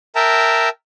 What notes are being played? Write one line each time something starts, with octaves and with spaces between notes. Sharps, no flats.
A#4 E5 G5 A5 A#5